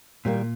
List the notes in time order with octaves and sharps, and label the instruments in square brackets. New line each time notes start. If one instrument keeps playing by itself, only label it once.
[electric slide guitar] A#2 [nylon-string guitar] D#3 G3 A#3